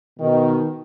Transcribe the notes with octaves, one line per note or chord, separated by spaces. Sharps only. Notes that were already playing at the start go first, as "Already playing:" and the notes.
B2 D#3